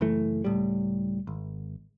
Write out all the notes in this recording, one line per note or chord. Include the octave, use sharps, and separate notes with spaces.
F#1 F#2 E3 A3
C#2 A2 G3
G#1